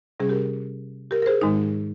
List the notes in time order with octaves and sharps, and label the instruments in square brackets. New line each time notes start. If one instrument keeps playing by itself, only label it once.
[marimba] C3 G3 C#4 G#4
G4 A#4
G4 A#4
A#4
G#4 C5
G#2 D#3 G#3 D#4